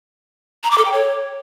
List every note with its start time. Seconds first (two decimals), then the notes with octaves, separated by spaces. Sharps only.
0.64 A#5
0.71 D6
0.78 A4
0.85 G5
0.92 C#5